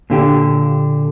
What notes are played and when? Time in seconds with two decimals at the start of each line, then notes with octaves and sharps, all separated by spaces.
0.10 A#2 D3 G4